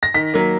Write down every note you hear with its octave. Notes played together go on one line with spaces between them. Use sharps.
A#6
D#3 B6
F#3 A#3